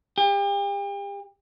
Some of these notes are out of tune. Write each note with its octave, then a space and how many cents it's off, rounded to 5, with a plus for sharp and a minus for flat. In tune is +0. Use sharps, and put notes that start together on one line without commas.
G4 +40